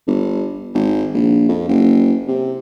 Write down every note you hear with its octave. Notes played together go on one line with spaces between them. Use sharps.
G1
G#1
A#1
F2
F#1
C3